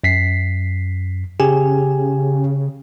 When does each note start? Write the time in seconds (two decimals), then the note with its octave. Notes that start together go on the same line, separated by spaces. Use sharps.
0.04 F#2 B6 C7
1.40 C#3 G4 G#4 G#5